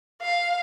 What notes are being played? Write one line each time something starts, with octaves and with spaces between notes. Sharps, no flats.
F5